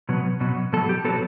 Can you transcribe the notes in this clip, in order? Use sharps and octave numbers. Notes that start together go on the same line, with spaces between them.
B2 F#3 B3
B2 F#3 B3
B2 F#3 B3 A4
G4
B2 F#3 B3 A4